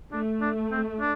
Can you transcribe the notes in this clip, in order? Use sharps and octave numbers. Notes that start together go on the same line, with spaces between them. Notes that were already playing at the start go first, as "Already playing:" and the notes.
A3 D4
D4
C4
D4